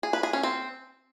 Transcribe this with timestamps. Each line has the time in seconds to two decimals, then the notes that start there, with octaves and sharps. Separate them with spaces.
0.03 G#4
0.13 B4
0.23 G#4
0.33 C#4
0.43 C4